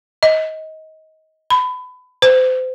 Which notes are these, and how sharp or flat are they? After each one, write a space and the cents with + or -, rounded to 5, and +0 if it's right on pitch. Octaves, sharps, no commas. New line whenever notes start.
D#5 +20
B5 +25
C5 -30